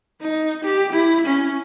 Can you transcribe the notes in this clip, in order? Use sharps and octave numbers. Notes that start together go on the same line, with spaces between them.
D#4
G4
E4
C#4